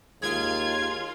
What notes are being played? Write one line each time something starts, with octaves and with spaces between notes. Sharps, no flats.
D#2 G#3 F4 G#6